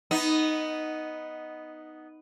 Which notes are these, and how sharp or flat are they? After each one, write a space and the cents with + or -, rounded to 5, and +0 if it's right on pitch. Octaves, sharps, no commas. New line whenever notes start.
B3 +0 D#4 +0